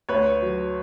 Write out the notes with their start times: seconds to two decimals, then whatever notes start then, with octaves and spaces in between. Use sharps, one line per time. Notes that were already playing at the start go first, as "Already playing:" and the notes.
0.09 D2 B4 C#5
0.42 F#3